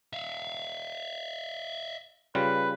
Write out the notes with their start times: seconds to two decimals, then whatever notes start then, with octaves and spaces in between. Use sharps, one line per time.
0.13 E5 F5
2.35 C#3 G3 F4 B4